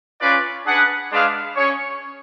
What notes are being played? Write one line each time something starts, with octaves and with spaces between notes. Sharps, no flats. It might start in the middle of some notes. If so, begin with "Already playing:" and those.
C#4 F4 B4 D5
D4 G#4 B4 F#5
G#3 D4 G#4 B4 F5
C#4 G#4 C#5